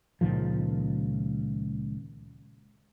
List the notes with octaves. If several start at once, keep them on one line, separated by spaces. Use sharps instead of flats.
C#2 A#2 D#3 F3